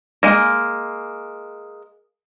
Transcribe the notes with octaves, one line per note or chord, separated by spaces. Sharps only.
G#3 A#3